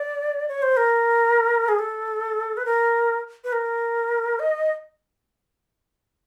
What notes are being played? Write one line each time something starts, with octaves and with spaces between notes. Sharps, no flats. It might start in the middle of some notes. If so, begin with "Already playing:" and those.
Already playing: D5
C#5
C5
A#4
G#4
A4
B4
A#4
B4
A#4
D#5